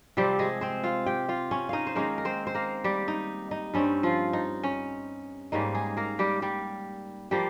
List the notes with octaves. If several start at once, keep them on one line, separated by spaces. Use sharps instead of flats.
C3 F3 G3 C4 G4
G#3 G#4
C4 C5
F4 F5
G4 G5
F4 F5
C#4 C#5
D#4 D#5 F5
C5
D#3 G#3 A#3 C#4 A#4
A#4
C4 C5
C5
A#3 A#4
G3 G4
D#4
D#4
G2 G3 C4 C#4
F3 F4
D#4
C#4
G#2 G3 A#3 C#4 D#4
G#3 G#4
A#3 A#4
G3 G4
G3 G4
F3 G3 A#3 G4